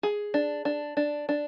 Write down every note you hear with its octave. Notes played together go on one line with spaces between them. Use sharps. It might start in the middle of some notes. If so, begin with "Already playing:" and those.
G#4
D4
D4
D4
D4